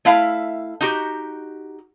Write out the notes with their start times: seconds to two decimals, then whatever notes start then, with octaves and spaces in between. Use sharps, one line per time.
0.05 A3 E4 E5 F5
0.81 D#4 F#4 G4